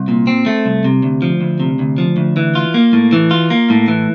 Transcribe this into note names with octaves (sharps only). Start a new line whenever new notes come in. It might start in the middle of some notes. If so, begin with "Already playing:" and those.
Already playing: C2
A#2
C4
A3
C2
C3
D2
F3
D2
C3
D2
F3
D2
E3
F4
A#3
A2
E3
F4
A#3
A2
E3